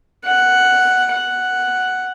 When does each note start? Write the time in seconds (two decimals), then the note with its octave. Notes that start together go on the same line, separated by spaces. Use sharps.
0.25 F#5
1.12 F#5